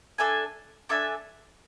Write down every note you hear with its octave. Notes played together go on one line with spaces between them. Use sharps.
D4 A4 E5 G#5
D4 A4 E5 G#5